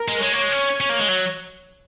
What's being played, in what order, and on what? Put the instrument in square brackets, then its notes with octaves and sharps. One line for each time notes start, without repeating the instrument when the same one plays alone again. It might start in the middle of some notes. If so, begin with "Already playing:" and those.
Already playing: [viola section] A#4
[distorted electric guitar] G#3
[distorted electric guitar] G#3 [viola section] C#5
[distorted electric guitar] A#3
G#3
C#4
C#4
A#3
G#3
F#3